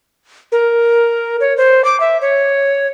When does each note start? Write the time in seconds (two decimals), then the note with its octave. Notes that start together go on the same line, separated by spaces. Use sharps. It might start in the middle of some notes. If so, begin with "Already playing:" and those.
0.52 A#4
1.41 C#5
1.57 C5
1.85 D6
2.00 E5
2.21 C#5